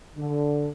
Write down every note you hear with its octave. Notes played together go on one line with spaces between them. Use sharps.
D3